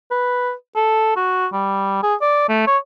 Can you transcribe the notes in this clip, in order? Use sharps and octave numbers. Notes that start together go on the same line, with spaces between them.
B4
A4
F#4
G3
G#4
D5
A3
C#5